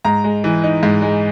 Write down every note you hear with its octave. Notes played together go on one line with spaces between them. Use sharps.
G#2 A#5
G#3
E3
D#4
G#2
G#3